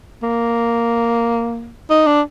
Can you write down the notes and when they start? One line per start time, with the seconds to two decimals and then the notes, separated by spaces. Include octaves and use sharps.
0.23 A#3
1.90 D#4
2.07 D4